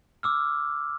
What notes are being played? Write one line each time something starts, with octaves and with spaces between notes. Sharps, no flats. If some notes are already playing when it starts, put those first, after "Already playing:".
D6 E6 F6